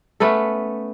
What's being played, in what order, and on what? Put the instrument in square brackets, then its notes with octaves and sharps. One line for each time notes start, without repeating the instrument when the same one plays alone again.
[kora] A3 B3 C#4 A4